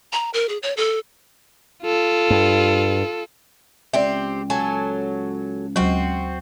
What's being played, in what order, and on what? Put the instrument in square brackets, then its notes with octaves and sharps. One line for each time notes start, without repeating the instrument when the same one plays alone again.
[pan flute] A#5
A#4
G#4
C#5
A4
[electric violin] F4 A4
[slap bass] G2
[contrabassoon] C#2 [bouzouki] C4 G4 [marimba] D5 E5
[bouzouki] F#3 A4 G#5
[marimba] D2 F#3 [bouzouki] C4 F#4